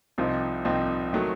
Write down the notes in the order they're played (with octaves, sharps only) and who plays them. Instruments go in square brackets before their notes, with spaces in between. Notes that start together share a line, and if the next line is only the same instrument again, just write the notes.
[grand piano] C2 C3 F3 C4 D#4
C2 C3 F3 C4 D#4
D#3 F#3 A3